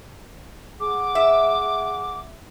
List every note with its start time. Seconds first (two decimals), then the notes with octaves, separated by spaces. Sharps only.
0.80 G#4 F#5 D6
1.15 E5